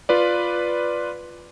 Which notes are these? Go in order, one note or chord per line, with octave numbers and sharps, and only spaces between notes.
F4 B4 D5